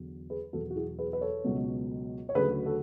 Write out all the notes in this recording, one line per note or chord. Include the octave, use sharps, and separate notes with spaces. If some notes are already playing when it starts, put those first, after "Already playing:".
Already playing: E2 D3 F#3
G#4 B4
E2 B2 F#3 F#4 A4
F#4
E4 G#4
G#4 B4
B4
A4 C#5
C#2 B2 F#3
C#5
D2 C#3 F#3 G#4 B4
F#4 A4